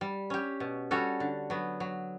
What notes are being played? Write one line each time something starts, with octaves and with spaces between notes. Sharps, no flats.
G3
C#4 G4
B2
G3 C#4 F#4 A4
D3
F#3 B3
F#3